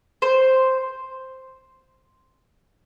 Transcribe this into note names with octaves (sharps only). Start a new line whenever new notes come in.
C5